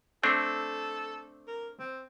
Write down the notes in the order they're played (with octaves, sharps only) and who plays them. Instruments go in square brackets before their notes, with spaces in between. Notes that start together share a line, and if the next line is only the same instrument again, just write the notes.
[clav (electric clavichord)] A3 C4 D4 [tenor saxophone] A4
[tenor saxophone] A#4
C4